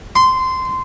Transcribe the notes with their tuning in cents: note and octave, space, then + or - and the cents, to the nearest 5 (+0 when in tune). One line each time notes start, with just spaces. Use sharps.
C6 -15